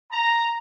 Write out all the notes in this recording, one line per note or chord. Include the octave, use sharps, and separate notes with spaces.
A#5